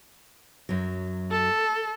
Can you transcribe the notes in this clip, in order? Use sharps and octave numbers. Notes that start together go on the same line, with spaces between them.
F#2 F#3
A4